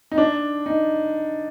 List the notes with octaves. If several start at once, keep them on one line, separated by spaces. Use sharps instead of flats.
D#4
D4
D#4